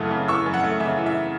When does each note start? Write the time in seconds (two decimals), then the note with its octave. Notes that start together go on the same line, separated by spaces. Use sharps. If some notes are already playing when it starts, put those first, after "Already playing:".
Already playing: F#2 C#3 E3 A3 F#5 A5
0.11 C#3
0.28 E3 C#6 E6
0.46 F#2
0.54 F#5
0.63 A3
0.80 C#3 E5
0.98 E3
1.06 E5